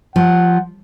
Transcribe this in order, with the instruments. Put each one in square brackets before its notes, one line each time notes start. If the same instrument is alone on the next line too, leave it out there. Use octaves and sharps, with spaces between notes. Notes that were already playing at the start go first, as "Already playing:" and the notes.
[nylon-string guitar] F3 [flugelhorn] F#5